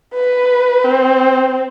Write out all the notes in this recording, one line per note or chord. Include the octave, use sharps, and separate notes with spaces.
B4
C4